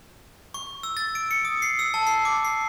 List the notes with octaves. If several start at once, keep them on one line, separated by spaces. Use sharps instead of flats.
C#6
E6
A6
D7
C#7
D#6
C7
E6
A5
C7
D6
C7